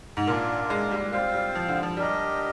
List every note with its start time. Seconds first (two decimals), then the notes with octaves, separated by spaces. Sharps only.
0.17 G#2
0.27 A#2 D4 F4 A#4
0.70 G#3
0.91 G3
1.12 G3 C4 F4 C5 F5
1.34 G3
1.55 F3
1.68 D3
1.83 F3
1.97 G3 D4 G4 A#4 D#5